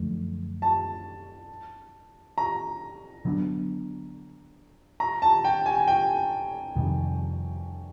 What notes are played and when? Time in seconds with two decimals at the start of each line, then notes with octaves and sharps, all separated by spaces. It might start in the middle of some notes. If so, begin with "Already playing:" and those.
Already playing: F#2 D3 F3 A3
0.62 A5
2.38 A#5
3.25 D3 F#3 B3 D4
5.00 A#5
5.22 A5
5.45 G5
5.66 G#5
5.88 G5
6.76 F2 C3 D#3 G3